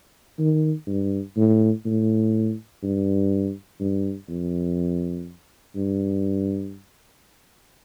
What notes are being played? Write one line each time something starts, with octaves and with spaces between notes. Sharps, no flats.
D#3
G2
A2
A2
G2
G2
F2
G2